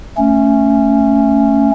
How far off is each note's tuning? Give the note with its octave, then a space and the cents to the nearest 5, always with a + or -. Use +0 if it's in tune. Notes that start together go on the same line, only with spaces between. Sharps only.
A3 +10 C#4 +0